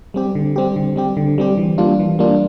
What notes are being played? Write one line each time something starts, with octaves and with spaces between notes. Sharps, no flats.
G3 C4 G4
D3
G3 C4 G4
D3
G3 C4 G4
D3
G3 C4 G4
E3
G3 A#3 D4 F4
E3
G3 A#3 D4 F4